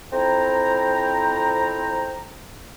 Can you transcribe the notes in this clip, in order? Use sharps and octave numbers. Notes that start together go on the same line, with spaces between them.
F2 C4 E4 C5 G5 A#5